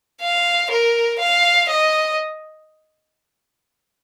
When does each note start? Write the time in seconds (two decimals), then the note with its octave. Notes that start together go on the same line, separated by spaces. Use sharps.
0.21 F5
0.71 A#4
1.19 F5
1.70 D#5